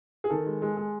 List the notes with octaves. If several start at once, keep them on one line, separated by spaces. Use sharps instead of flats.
G#4
D#3 A4
G#3
G#3
G#3